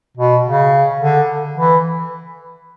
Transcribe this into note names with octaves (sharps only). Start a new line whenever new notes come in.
B2
C#3
D3
E3